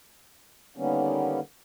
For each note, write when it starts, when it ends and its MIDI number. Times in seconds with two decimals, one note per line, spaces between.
0.77 1.40 50
0.77 1.40 51
0.77 1.40 55
0.77 1.40 58
0.77 1.40 59
0.77 1.40 61